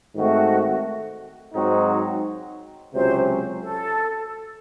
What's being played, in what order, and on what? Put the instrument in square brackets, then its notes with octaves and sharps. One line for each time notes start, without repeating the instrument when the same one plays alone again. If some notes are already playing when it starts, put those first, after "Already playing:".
[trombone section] G#2 D#3 A3 C4 [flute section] F#4
[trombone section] G#2 F#3 C4 D#4 F#4
[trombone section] C#2 C3 F#3 C#4 [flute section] C5
[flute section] A4